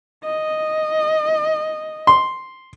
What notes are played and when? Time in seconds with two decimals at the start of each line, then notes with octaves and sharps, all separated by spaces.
0.25 D#5
2.07 C6